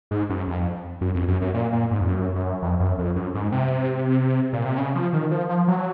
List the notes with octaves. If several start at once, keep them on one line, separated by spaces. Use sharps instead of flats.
G#2
F#2
F2
F#2
F2
F#2
F#2
A#2
A#2
G#2
F2
F#2
F#2
F2
F#2
F2
F#2
G#2
C3
A#2
C3
C#3
F3
D#3
F3
F3
F#3